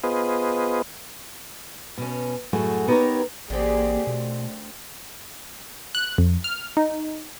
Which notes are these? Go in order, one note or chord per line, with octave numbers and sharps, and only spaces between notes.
B3 F4 G#4 B4 C5 D#5
B2 C#4
F#2 A2 A3 F#4 G#4
B3 D#4 G4 A4 A#4 C#5
A1 D3 A#3 C4 G4 G#4
B2 A3
F#6
F2
F6
D#4